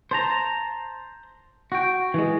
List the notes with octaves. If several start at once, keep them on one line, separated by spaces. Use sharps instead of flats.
C5 A5 A#5
F#4 G5
E3 G#3